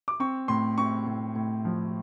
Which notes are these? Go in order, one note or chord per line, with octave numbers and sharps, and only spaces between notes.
D6
C4 C#6
A2 C6
C4 C#6
A2
A2
F3